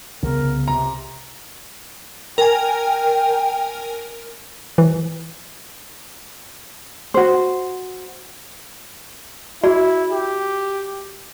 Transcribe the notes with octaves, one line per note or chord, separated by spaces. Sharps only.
C2 C#3 B3 A#4
C3 A#5
A#4 G5 G#5
E3
F#4 C5
E4 F#4 G#4 D5
G4